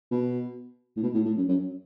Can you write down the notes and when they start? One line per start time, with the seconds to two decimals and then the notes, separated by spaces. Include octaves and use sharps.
0.11 B2
0.96 A2
1.03 B2
1.14 A2
1.25 A2
1.37 F#2
1.48 F#2